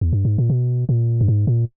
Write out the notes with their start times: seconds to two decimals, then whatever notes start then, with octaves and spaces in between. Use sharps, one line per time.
0.01 E2
0.13 G2
0.25 G#2
0.38 A#2
0.50 B2
0.89 A#2
1.21 G2
1.28 G#2
1.47 A#2